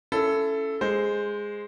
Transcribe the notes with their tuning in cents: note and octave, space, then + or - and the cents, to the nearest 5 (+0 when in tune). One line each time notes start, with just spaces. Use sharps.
C#4 +5 E4 +25 A4 +0
G#3 -10 C5 +0